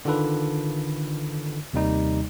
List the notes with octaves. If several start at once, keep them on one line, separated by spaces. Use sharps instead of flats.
D3 D#3 F4 A4 B4
D#2 C3 D#3 G3 D#4